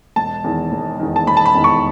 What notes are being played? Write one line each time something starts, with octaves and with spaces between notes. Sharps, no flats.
E1 A5
E2 D#3
E1
E2 D#3
A5
E1 B5
A5
B5
E2 D#3
C#6